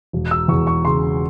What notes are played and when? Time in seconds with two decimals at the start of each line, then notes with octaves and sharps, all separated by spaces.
0.13 E1
0.31 E6
0.48 E2 C#6
0.67 C#6
0.85 C#3 C6